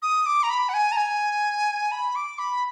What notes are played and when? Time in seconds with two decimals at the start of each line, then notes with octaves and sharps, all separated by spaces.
0.02 D#6
0.26 D6
0.43 A#5
0.50 B5
0.69 F#5
0.74 G#5
0.92 A#5
0.97 G#5
1.92 B5
2.15 D6
2.39 B5